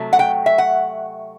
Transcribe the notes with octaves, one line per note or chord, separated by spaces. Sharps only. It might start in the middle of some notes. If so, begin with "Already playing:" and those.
Already playing: C3 F#3 A3
F#5
G5
E5
F#5